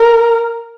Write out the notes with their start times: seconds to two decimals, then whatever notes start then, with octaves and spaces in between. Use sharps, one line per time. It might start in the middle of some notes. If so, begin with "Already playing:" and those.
Already playing: A#4